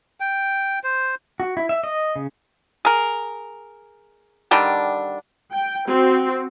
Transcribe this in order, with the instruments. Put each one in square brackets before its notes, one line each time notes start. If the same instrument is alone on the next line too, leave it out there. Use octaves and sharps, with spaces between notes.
[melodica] G5
C5
[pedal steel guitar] F#4
E4
E5
D#5
C#3
[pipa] G#4 A#4
D3 D#3 G3 D4
[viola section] G5
C4 F#4